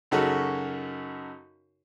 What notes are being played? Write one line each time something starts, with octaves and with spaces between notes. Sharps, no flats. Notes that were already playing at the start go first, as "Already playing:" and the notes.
F#2 C#3 D#4 F#4 A4